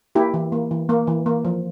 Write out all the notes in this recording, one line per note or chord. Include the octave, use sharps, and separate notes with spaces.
A#3 E4 G4
E3
A#3
E3
A#3
E3
A#3
F3